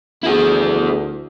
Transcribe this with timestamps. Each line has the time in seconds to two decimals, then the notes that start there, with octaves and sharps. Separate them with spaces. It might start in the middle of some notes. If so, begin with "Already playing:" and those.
0.24 D2 E4 G#4